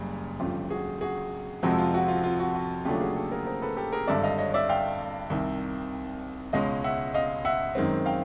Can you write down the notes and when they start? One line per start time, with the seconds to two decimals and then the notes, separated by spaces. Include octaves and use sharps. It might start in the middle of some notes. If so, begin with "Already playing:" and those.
Already playing: F#1 F#2 C#3 G3
0.40 G#1 F#2 D3 F4 G4
0.70 F#4 G#4
1.01 F#4 G#4
1.63 F2 C3 F3 G#3 F#4
1.79 F4
1.94 F#4
2.08 F4
2.24 F4
2.39 F#4
2.55 F#4
2.85 D#2 C#3 F#3 A3 D4 F4 G4
3.01 F#4 G#4
3.16 G4 A4
3.31 G#4 A#4
3.46 A#4 C5
3.62 A4 B4
3.77 G4 A4
3.92 G#4 A#4
4.07 G#1 G2 D3 D5 E5
4.23 D#5 F5
4.38 C#5 D#5
4.54 D5 E5
4.69 F5 G5
5.30 C2 C3 D#3
6.53 C#2 B2 G#3 C#4 D#5 F5
6.84 E5 F#5
7.14 D#5 F5
7.45 E5 F#5
7.75 F#2 D#3 G#3 C4
8.06 F5 G5